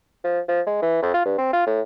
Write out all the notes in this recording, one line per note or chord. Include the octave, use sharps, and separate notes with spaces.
F3
F3
G#3
E3
F2
F4
G2
C4
F4
A2